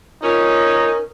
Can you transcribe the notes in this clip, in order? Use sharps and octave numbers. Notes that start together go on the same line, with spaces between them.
C#4 D#4 F4 A#4